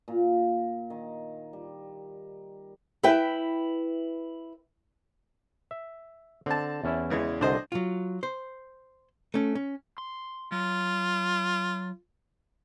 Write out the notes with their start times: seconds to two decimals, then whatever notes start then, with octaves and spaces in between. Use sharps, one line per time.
0.08 A#2
0.90 D#3
1.53 G3
3.03 E4 B4 E5 G5
5.71 E5
6.46 D3 C4 A5
6.84 E2 C#4 E4
7.10 C#3 E3 G#3
7.41 C2 D3 D4 C5 D#5
7.72 F#3 F4
8.23 C5
9.34 A3 C#4
9.55 C#4
9.98 C6
10.52 F#3 F4